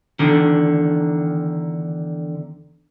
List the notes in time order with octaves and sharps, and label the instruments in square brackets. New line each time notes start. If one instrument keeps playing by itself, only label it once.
[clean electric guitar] E2 D3 D#3